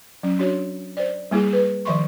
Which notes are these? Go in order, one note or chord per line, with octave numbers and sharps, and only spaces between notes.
F#3 C#4
D4 F#4 C#5
C5 D5
G3 A#3 E4 G#4
B4
D#3 F3 E5 C6 C#6